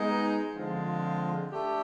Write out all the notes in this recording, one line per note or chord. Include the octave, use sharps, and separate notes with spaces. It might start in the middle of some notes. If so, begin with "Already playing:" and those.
Already playing: G#3 B3 D#4
D3 F3 G#3 C4 F4
A3 D4 G4